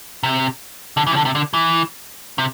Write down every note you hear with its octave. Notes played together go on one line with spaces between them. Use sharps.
C3
D3
E3
C3
D3
C3
D3
E3
C3